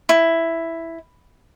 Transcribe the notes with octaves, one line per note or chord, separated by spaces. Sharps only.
E4